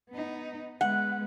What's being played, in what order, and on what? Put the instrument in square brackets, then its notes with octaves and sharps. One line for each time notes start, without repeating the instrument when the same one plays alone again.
[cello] B3 D#4
[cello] G#3 B3 [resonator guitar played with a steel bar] F#5